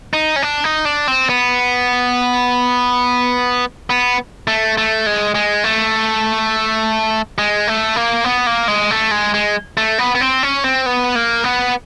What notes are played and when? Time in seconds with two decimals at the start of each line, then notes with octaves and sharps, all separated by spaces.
0.13 D#4
0.36 C#4
0.42 D4
0.64 D#4
0.85 D4
1.08 C4
1.29 B3
3.90 B3
4.47 A3
4.78 A3
5.06 G#3
5.35 G#3
5.64 A3
7.38 G#3
7.67 A3
7.96 A#3
8.24 B3
8.47 A#3
8.68 G#3
8.91 A3
9.11 G#3
9.34 G#3
9.77 A3
9.99 B3
10.15 B3
10.21 C4
10.43 C#4
10.64 C4
10.86 B3
11.15 A#3
11.44 B3